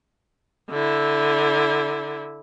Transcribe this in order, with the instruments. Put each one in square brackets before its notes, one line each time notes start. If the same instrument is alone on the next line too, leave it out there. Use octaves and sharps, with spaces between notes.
[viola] D3 E4